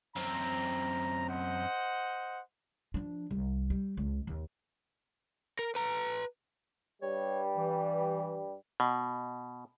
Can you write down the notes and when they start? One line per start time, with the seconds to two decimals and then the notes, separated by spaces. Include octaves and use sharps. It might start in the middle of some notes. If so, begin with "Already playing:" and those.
0.16 F#2 C4 A#5
1.29 C5 D#5 F#5
2.94 F3 D4
3.31 C2
3.70 G3
3.97 C#2
4.27 D#2
5.59 A#4
5.75 B4 A#5
7.02 G2 G3 C#5
7.57 E3
8.80 B2